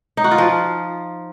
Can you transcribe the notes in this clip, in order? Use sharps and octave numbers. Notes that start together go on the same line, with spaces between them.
D#4
F#4
F4
F3